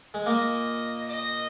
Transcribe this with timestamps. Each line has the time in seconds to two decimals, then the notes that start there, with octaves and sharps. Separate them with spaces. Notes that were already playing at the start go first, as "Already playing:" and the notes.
0.14 G#3
0.26 A#2 A#3 D#5
1.08 D#5